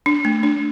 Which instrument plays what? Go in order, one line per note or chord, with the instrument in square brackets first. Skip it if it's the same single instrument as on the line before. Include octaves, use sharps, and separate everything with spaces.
[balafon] D4
A3
D4